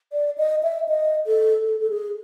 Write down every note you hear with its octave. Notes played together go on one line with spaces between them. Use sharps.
D5
D#5
E5
D#5
A4
A4
A4
G#4